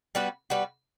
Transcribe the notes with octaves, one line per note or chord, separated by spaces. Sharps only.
G3 B3 F#4 B4
G3 B3 F#4 B4